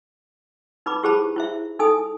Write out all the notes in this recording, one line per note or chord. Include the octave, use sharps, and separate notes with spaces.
D#4 B4 B5 D6
E4 G4 G#4 C5 A5 B5
E4 C5 E5
D#4 A4 G#5 D#6